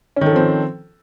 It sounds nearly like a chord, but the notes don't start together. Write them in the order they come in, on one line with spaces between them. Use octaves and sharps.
C#4 D#3 A4 F3 C4